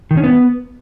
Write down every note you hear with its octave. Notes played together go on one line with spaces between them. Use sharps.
D#3
C#4
B3